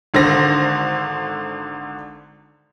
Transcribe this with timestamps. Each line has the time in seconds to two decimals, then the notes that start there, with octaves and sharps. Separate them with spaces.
0.14 G#1 D3 C5 A#6